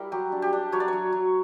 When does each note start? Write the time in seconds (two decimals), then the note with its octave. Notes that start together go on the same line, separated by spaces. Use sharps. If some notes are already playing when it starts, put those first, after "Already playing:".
Already playing: G3 E4 A#4
0.12 F#3 G4
0.32 D4
0.42 G4
0.53 D4
0.72 F#3 C#5
0.80 D5
0.88 F#3 C#5
1.12 F#3